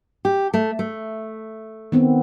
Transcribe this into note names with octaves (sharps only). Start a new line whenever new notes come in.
G4
A3
A3
D#3 B3 C4